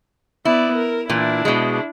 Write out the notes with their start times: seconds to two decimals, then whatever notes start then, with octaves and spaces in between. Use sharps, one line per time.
0.45 B3 E4 D5
0.75 A#4
1.10 A#2 E3 D4 E4
1.45 B2 G#3